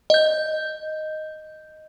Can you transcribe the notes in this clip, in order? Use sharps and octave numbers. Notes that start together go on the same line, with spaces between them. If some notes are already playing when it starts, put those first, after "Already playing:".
D#5 G6